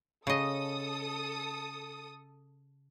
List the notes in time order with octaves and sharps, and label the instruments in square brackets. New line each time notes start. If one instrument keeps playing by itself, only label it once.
[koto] C#3 D#5 [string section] A4 D#6